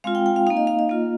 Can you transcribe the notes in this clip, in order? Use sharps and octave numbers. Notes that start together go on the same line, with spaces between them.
G#3 C4 F4 F5
G5
G5
F5
A#3 D#4 F5
D#5
F5
D#5
A#3 F4